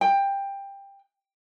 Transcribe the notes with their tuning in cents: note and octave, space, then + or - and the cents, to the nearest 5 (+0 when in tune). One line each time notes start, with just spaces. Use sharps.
G5 +15